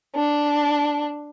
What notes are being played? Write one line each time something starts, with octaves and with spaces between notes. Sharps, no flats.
D4